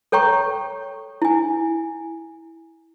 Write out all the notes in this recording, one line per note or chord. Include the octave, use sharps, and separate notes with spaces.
A4 C#5 G5 A#5 C#6
E4 G#5